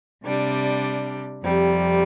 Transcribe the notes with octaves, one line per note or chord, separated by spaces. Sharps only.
C3 G3 D4
F2 C3 G3